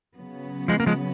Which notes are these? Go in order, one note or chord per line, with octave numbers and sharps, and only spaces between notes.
C#3 F#3 B3
F3 G#3
A#3
F3 G#3